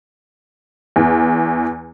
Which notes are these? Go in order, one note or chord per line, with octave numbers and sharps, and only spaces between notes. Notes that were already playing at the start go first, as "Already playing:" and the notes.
E2